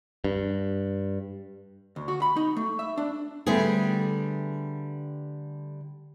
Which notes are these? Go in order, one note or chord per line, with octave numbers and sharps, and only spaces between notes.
G2
D2
F#4
B5
D#4
A3
E5
D4
D3 G3 A3 B3 G#4